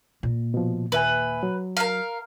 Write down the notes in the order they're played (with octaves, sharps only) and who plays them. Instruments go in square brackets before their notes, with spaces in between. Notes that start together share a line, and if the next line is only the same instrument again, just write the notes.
[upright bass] A#2 A#3
[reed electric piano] B2 F3
[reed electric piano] D#2 E5 G#5 [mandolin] B4
[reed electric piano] F#3
[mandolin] A#4 F5